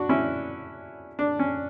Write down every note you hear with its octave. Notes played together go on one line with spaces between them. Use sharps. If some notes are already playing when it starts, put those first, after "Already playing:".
Already playing: D4 F#4
C#4 E4
D4
C#4